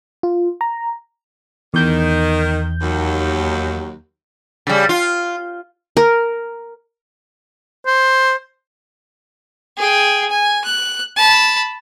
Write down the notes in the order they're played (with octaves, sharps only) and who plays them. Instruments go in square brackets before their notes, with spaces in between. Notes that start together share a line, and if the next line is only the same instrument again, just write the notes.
[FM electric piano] F4
A#5
[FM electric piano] E2 G6 [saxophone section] D#3
[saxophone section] D#2 F#3
[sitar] C#3 G3
F4
[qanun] A#4
[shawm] C5
[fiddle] G#4 G5
G#5
F#6
A5 B5